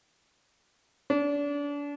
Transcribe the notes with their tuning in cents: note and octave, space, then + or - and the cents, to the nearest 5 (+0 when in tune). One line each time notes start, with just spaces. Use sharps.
D4 -35